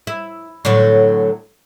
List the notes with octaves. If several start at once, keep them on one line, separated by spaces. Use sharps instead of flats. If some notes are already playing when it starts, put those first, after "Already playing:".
E4
A2 D3 F#3